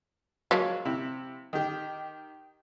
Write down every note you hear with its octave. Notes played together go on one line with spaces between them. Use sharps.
F3 F#3 G#3 A#3 C#5
C3 E4
D#3 G4